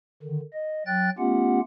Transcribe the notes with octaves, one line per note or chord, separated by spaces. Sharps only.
D3 D#3
D#5
F#3 G5 F#6 A6
A3 B3 C#4 F4 G4 F#5